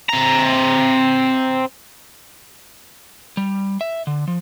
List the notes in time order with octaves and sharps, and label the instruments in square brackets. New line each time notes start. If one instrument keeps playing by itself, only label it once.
[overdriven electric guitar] C4 A#5
[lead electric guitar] G3
E5
D3
F3